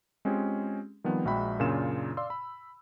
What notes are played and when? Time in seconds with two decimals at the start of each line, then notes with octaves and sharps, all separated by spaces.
0.25 G#3 C4 C#4 F4 G4 G#4
1.04 D#3 F3 G3 B3 C4
1.25 A#1 G#3 F#4 E5 G5 B5
1.59 F#2 A#2 C#3 D4 F4 E7
2.17 D5 F5 C6 E6
2.30 B5